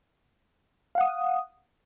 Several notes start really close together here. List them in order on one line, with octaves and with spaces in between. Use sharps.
F5 F#5 D#6